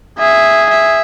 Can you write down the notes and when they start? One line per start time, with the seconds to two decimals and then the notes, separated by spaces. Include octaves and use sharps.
0.19 G#4 E5
0.70 E5